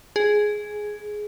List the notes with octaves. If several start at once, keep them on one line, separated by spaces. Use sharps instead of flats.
G#4